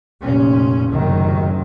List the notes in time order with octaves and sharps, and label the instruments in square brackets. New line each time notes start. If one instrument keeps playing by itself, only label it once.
[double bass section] F1 A#2 C#4
F#1 C2 F#2 A2 D#3 F#3